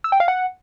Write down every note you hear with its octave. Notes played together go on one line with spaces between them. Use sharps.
E6
G5
F5
F#5